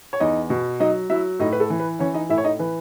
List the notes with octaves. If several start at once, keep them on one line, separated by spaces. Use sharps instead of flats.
C#5
E2 D#4 D#5
B2
F#3 D#4 D#5
F#3 E4 E5
A2 D#4 D#5
B4
A4
E3
B4
E3 C#4 C#5
D#4 D#5
A2 E4 E5
C#5
D#4 D#5
E3 B4